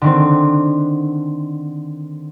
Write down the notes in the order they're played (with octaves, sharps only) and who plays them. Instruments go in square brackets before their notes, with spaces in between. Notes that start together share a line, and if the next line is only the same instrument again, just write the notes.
[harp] D3 D#3 C4